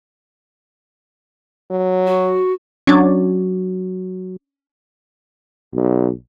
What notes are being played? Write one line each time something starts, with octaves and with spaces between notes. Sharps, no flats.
F#3
F#4
F#3 C#4 D4
B1